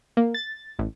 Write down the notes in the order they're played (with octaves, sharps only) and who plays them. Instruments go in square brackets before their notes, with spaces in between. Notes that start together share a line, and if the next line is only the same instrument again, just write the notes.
[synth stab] A#3
A6
A1